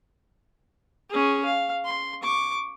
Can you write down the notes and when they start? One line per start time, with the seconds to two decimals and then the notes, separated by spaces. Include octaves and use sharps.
1.09 C#4 G#4
1.45 F5
1.85 C6
2.22 C#6 D6